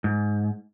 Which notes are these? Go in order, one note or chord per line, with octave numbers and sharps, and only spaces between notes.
G#2